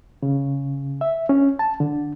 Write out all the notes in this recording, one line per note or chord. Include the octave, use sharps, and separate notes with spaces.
C#3
E5
C#4
A5
D3